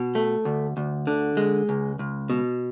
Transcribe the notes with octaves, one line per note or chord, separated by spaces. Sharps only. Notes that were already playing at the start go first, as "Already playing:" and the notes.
Already playing: B2
A3
D2
D2
D3
G#3
C#2
C#2
B2